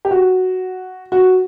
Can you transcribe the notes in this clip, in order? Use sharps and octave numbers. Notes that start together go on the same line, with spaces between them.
G4
F#4
F#4